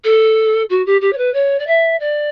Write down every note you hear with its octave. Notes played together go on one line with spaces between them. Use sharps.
A4
F#4
G4
G4
C#5
B4
C#5
D5
E5
D5